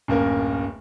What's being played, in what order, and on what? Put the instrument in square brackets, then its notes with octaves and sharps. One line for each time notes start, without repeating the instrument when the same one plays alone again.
[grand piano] D1 F#2 A#3 A#4